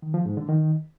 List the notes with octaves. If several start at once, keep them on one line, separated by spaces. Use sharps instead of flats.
D#3
F3
G#2
D3
D#3